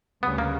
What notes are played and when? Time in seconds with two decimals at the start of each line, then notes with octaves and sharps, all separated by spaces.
0.22 D2 C#3 G3 B3 C#4
0.38 A#3